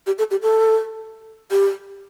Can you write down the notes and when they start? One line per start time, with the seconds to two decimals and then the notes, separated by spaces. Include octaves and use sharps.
0.07 G4
0.18 A4
0.31 G4
0.42 A4
1.51 G4